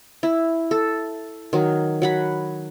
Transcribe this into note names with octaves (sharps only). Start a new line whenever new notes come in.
E4
A4
D#3 F#3
F#3 F#5 B5